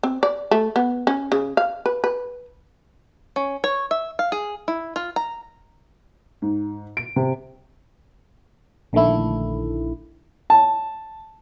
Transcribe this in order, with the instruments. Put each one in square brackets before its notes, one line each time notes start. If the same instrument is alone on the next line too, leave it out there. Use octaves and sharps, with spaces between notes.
[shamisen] C4
D5
A3
B3
C#4
C#3
F5
B4
B4
[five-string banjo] C#4
C#5
E5
F5
G#4
E4
F4
A#5
[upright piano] G#2
D7
C3
[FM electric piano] A#1 D3 D#3 A3 E4
[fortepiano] A5